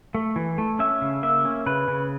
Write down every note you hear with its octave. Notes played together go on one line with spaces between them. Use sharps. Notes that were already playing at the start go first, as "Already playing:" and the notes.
A3
E3
A3
C#4 E5
C#3
A#3 E5
C#4
C#3 B4
C#3